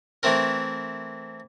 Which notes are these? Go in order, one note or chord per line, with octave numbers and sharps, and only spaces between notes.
E3 A3 C4 A#4